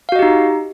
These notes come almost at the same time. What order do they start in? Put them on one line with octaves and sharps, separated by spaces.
F5 F#4 D#5 G4 D#4